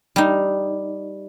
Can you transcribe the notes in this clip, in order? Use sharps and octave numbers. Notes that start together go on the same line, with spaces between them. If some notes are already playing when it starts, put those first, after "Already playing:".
G3 D#4